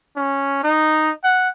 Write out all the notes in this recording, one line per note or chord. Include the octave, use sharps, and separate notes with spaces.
C#4
D#4
F#5